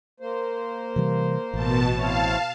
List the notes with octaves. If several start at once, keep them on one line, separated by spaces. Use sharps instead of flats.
A#3 C5
C3 E3 G3
A1 B2 A5
C4 E4 C#5 F5 A5